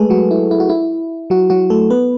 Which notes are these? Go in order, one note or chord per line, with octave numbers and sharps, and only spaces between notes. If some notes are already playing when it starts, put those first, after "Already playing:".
Already playing: G#3 A3 G#4 A4 B4
F#3 F#4
E4
E4
F#4
E4
F#3 F#4
F#3 F#4
A3 A4
B3 B4